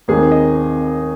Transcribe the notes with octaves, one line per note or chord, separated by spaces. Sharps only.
D#2 D#3 G#3 C4 D#4 G#4
D#5